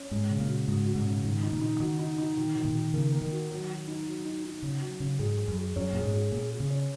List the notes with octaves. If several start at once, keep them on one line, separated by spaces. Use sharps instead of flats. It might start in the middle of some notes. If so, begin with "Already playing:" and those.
Already playing: C#4
G#2 G#3
C#3
A#2
F#4
G#2 F#4
F#4
G#2
C#3
G#2 D#3
D#4
A#2
D#4
D#3 F#4
D#4
D#4
D#3
D#3
A#2
D#3
C#3 A#3
A#3
D#3
F#4
F#3
F#3
D#4
F#3
D#4
D#4
C#3 C#4
F#3
C#3 C#4
G#2 G#4
G#4
F#2
G#4
F#2 C#4
A#2 G#4
G#2
G#4
A#2 G#4
G#4
C#3
C#4